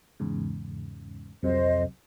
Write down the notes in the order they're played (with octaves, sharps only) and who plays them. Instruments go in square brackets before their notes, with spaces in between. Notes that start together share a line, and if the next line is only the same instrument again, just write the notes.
[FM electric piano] E2 G#2 C#3
[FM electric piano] C2 C3 F#3 [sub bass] F2 [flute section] C5 D#5